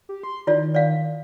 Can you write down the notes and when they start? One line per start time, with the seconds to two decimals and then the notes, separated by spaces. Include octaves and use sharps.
0.09 G4
0.24 C6
0.47 D#3 E4 F4 D5
0.75 D5 F5